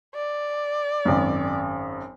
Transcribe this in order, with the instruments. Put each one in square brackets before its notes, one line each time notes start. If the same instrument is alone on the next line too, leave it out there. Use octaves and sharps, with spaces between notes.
[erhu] D5
[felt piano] G#1 F#2